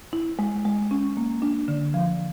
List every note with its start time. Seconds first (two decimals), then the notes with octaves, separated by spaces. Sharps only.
0.13 E4
0.39 G#3
0.65 G#3
0.91 C#4
1.17 A#3
1.42 D4
1.68 D3
1.94 F3